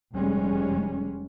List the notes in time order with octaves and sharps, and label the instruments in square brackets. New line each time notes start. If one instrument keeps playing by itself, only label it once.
[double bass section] F1 G3 G#3 C#4